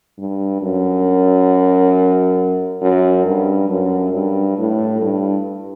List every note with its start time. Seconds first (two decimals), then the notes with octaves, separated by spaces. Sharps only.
0.18 G2
0.62 F#2
2.82 F#2
3.26 G2
3.69 F#2
4.13 G2
4.58 A2
5.01 G2